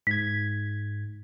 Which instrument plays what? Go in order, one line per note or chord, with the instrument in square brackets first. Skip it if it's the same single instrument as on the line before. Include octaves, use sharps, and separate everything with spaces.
[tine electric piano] G#2 G#6 [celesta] B6